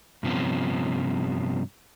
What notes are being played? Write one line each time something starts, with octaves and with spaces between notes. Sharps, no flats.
G2 C3 F3 B3 C#4